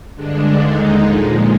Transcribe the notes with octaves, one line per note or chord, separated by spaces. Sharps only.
G2 D3 G#3 D4
D#2 D3 G#3 D#4
A#2 F3 G#3